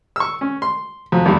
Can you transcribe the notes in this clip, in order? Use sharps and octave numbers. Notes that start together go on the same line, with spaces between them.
C#6 E6
C#4
C6
F2 F#3
B1 E2 G3